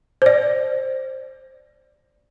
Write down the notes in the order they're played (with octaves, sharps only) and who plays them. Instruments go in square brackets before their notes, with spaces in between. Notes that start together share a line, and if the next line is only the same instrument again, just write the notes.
[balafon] C5 D5